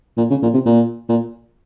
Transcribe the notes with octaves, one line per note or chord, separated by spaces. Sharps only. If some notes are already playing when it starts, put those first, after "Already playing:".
A#2
C#3
A#2
C3
A#2
A#2